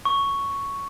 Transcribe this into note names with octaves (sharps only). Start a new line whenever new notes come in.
C#6